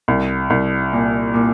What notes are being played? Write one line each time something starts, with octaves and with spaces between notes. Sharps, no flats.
C2
C2
A#2
A#2